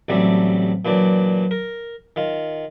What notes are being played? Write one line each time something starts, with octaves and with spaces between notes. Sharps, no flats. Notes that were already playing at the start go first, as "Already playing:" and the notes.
A1 C3 F#3 G3 A3 D5
A#2 E3 F#3 D4 D5
A#4
D#3 F4